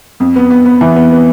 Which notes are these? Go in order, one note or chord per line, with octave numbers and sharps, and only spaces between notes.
F2
B3
B3
B3
E3
B3
B3